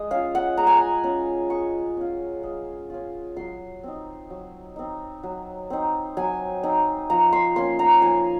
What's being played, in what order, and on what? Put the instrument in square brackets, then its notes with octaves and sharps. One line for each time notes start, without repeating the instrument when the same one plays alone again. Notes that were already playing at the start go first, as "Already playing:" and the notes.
Already playing: [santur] G#3 D#5
C#4 F4 F5
F#5
G#3 A#5
G#5
A#5
C#4 F4
G#3 C#6
C#4 F4
G#3
C#4 F4
F#3 C6
C4 D#4
F#3
C4 D#4
F#3
C4 D#4
F#3 G#5
C4 D#4
F3 A#5
C6
A#3 C#4 C6
A#5
F3 G#5